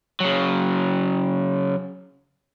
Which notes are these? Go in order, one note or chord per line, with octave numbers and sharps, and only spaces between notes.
C#3 F#3